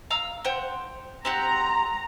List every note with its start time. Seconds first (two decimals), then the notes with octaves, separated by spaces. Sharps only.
0.10 F5 A#5 E6
0.44 C5 F#5 G5
1.25 C4 G4 F#5 A#5